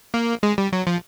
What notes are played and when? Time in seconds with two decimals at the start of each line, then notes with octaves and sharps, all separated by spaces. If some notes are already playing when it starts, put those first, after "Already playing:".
0.14 A#3
0.43 G#3
0.58 G3
0.73 F#3
0.87 F3